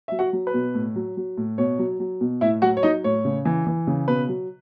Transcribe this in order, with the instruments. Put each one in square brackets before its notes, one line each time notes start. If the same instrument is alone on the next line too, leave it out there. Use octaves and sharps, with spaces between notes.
[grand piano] F#3 E5
F#4 F#5
F#3
B4
B2
A2
F#3
F#3
A2
B2 C#5
F#3
F#3
B2
A2 E4 E5
F#3 F#4 F#5
C#5
F#3 D#4 D#5
A2 C#5
C#3
E3
E3
C#3
B2 B4
F#3